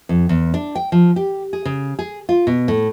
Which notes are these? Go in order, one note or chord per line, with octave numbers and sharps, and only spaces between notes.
F2
E2
D4
G5
F3
G4
G#4
C#3
G#4
F4
B2
A2